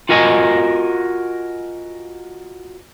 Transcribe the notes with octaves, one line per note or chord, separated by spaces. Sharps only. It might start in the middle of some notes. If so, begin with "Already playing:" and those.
F4 F#4 A#4 D#5 G#5